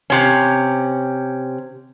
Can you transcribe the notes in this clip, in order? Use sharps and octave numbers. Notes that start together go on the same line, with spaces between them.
C3 C#4